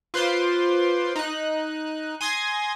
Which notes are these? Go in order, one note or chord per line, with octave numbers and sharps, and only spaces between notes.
F4 B4 C5 C6 D6
D#4 F#6
G#5 C6 D#6 G#6 A#6